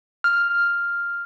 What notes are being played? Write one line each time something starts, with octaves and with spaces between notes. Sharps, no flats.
F6